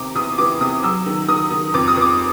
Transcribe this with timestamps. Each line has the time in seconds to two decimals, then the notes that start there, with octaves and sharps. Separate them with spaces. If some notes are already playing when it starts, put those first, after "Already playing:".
Already playing: C3 D#3 D6
0.15 E2 D#6
0.38 E3 D6
0.60 C3 D#6
0.83 F#3 E6
1.06 D#3
1.28 D#3 D#6
1.51 D#3
1.74 F2 D6
1.88 D#6
1.97 F2 D6